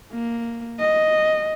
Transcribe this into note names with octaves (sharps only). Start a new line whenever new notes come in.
A#3
D#5